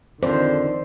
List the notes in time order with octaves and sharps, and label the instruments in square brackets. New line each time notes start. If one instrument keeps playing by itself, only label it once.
[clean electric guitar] F2 D3 [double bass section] D#3 [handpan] C5 [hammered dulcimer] D5 C6